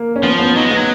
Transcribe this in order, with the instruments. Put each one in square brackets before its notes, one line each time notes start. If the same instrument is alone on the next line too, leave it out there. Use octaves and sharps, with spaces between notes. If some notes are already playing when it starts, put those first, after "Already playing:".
Already playing: [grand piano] A#3
C#4
[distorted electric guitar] F3 [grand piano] B3
[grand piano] B3
[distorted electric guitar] F#3 [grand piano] D#4
[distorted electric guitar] G#3 [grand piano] B3
[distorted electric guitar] F#3